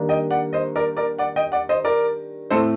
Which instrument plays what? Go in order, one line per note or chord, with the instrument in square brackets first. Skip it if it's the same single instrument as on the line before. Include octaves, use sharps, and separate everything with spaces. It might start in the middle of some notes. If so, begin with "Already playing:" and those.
Already playing: [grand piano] D#3 G3 A#3 D4
D#5 G5
D5 F#5
C5 D#5
A#4 D5
A#4 D5
D5 F#5
D#5 G5
D5 F#5
C5 D#5
A#4 D5
A2 A3 C4 A4 C5